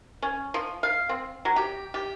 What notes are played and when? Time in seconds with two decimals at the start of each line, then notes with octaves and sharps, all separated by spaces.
0.22 C#4
0.54 F3
0.83 F5
1.09 C4
1.45 F#3
1.56 G4
1.94 G4